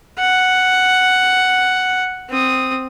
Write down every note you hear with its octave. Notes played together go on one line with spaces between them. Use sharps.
F#5
C4 D#6